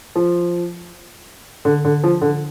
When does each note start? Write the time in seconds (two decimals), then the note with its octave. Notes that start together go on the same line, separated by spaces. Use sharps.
0.16 F3
1.65 D3
1.84 D3
2.03 F3
2.21 D3